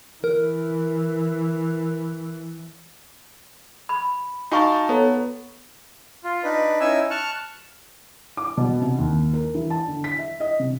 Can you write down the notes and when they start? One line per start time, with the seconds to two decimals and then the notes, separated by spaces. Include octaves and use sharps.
0.24 E3 A#4
3.89 B5
4.52 D#4 F#4 F5 G#5 A5 C#6
4.89 B3 A4 C#5 A#5
6.24 F4
6.43 D4 D#4 B4
6.80 C#4 D#4 E4 G#5 E6
7.10 A5 C#6 F6 F#6
8.37 D6
8.57 B2
8.81 C3
8.99 D#2
9.33 A#4
9.55 E3
9.70 A5
9.87 D3
10.04 B6
10.19 E5
10.40 D#5
10.59 C3